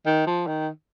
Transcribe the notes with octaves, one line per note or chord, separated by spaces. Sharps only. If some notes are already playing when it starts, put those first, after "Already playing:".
D#3
F3
D#3